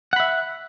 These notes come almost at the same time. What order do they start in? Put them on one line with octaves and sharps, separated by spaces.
F#5 B5 E5